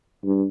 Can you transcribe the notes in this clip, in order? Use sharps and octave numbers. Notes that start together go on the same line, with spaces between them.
G2